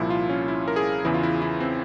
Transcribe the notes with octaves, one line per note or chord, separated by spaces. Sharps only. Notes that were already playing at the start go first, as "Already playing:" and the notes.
Already playing: C2 A#2 F3 E4
F4
C#4
E4
A#4
G#4
E2 C#3 E3 E4
F4
E4
E4
C4